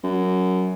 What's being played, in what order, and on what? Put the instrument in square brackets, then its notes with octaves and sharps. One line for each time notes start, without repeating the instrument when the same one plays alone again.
[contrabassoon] F#2